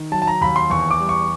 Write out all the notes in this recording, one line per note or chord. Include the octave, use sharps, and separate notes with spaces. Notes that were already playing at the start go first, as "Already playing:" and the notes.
Already playing: D#3
F#3 A5
A5
A#5
D#2 B5
C6
E2 C#6
D6
G3
C#6